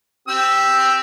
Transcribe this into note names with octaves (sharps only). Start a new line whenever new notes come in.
C4 G4 E6